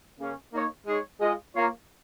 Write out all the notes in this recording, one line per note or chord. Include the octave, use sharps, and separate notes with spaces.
C#3 A#3 C#4
A#3 D#4 C#5
G#3 D#4 G#4 C#5
G#3 F4 G#4 D#5
A#3 F4 C#5